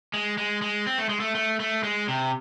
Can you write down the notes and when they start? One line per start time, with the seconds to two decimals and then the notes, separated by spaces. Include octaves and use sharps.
0.14 G#3
0.38 G#3
0.62 G#3
0.87 C4
0.98 A3
1.09 G#3
1.20 A3
1.35 A3
1.60 A3
1.83 G#3
2.08 C3